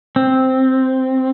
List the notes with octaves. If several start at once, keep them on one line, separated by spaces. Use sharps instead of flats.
C4